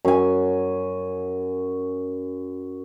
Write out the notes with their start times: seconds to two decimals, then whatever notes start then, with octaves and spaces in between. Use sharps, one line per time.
0.05 F#2 G#5